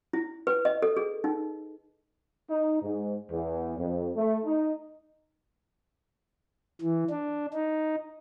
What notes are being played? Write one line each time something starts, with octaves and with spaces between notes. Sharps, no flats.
E4
B4
D#5
A4
G#4
D#4
D#4
G#2
E2
F2
A3
D#4
E3
D4
D#4